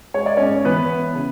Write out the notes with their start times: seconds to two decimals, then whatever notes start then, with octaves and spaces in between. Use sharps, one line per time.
0.14 G#3 C#5
0.26 D5
0.37 G#2 C#4 C#5
0.65 E3 B3 B4
0.90 B3
1.15 C#3